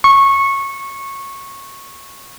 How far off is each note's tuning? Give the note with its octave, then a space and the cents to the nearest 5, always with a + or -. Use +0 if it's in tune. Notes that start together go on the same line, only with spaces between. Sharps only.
C#6 -15